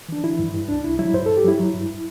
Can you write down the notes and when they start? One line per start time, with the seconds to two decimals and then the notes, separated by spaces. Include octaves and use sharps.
0.09 E3 D4
0.24 E3 E4
0.39 G2
0.54 G2
0.69 C2 D4
0.84 C2 E4
0.99 F#3 E4
1.13 G2 C5
1.26 G2 A4
1.37 G4
1.44 F#3 E4
1.59 F#3
1.74 G2